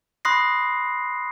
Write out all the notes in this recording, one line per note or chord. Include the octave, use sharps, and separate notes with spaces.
B5 C6 D#6 F#6 A#6 C7